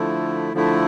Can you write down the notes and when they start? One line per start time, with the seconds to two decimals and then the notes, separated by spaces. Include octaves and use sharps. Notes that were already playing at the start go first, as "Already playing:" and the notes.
Already playing: D3 F3 A3 E4
0.54 D3 F3 A3 E4